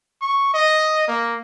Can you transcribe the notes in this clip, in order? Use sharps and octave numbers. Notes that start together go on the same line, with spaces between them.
C#6
D#5
A#3